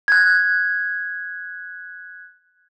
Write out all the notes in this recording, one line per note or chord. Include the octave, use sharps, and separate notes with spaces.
F#6 G#6